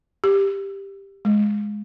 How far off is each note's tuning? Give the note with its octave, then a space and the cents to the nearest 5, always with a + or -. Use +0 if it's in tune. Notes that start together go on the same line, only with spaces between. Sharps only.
G4 +5
G#3 +5